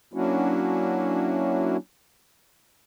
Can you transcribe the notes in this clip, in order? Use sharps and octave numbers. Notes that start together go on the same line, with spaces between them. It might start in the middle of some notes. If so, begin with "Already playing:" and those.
F#3 A#3 C#4 D4 E4 F#4